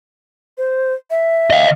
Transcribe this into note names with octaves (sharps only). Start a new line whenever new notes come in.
C5
E5
D#5 F5